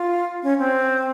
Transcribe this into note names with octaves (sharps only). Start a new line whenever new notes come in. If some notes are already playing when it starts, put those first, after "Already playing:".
Already playing: F4
C#4
C4